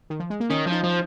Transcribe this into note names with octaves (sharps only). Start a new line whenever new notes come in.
D#3
F3
G#3
A#3
D#3 C#4
F3
D#4
F3